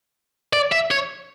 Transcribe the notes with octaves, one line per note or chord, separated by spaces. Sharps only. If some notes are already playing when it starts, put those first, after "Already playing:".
D5
E5
C#5